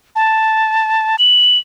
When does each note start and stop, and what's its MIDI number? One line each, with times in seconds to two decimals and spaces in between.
0.16 1.16 81
1.19 1.58 102